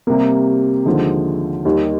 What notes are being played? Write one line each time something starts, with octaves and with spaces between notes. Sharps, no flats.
C3 G3 A#3
D#2 D3 F3 G#3
D#2 D#3 G3